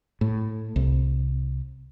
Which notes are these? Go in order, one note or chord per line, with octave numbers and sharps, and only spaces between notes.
A2
C2